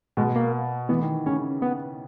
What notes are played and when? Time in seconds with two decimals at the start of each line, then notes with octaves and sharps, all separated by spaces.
0.17 B2 G#3
0.35 A#3
0.89 E3 B3
1.02 D#3
1.26 C#3 C#4
1.62 B3